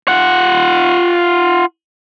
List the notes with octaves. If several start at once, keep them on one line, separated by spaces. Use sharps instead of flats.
F4 F#5